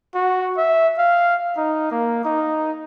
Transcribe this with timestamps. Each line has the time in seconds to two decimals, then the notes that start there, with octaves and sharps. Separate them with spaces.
0.15 F#4
0.58 E5
0.98 F5
1.57 D#4
1.91 A#3
2.24 D#4